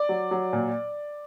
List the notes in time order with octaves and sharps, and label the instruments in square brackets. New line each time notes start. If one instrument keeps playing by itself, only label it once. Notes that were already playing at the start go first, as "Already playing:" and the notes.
Already playing: [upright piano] D5
F#3
F#3
A#2